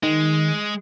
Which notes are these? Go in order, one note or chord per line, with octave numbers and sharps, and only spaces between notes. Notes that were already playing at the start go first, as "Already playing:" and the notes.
D#3 G#3